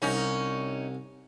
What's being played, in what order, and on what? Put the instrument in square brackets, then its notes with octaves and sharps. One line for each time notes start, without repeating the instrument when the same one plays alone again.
[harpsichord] C2 [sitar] C#4 D#4